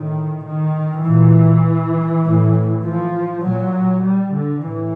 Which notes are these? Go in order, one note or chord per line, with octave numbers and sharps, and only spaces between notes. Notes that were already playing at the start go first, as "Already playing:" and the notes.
Already playing: A2 D#3
D#3
A#2 E3
A2
F3
A#2 F#3
G3
D3
A2 E3